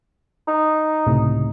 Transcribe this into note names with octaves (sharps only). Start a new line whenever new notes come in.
D#4
C#2 A2 C3